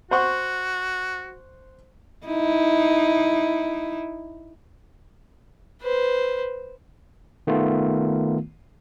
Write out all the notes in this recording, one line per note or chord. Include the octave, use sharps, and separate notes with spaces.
F#4 C5 F#5 C#6
D#4 E4
B4 C5
D#3 A3 B3 F4